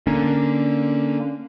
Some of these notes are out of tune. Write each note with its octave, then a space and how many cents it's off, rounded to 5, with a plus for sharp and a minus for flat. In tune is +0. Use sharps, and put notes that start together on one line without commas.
D3 +0 A#3 +0 C#4 +0